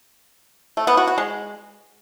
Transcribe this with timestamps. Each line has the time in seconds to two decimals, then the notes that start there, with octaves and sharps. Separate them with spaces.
0.77 A3
0.87 B3
0.97 F#4
1.08 F#4
1.18 G#3